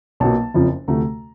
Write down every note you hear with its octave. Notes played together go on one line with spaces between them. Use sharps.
B1 A#2 F#3 A#3 A5
F#1 F2 C#3 F3
D2 C3 F3 A3 A#5